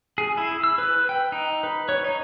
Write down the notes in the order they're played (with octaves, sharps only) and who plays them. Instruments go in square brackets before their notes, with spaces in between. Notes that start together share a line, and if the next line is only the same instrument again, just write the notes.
[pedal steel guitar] G#4
E4
E6
B4
G5
D#4
B4
C#5
D#4